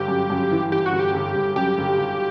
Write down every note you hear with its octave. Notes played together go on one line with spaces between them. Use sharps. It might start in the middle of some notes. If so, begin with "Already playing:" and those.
Already playing: G1 G4
F#2
F#2
E3
E3 G4
F#4
G1
G4
G1
G1
F#2 G4
G1
G1